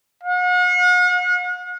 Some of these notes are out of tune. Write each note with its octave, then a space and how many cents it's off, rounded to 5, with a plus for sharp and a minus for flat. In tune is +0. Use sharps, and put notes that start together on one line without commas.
F#5 -45